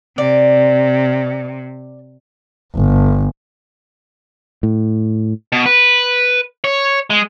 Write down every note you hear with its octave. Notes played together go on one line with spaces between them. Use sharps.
C3 D5
G1
A2
B2
B4
C#5
G#3